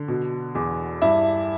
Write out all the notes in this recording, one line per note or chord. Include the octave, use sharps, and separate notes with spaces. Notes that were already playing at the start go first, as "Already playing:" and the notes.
Already playing: D3
B2
E2
G2 E4